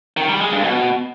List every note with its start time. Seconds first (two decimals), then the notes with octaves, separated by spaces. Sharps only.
0.17 D#3
0.29 G3
0.40 G#3
0.52 G2
0.64 B2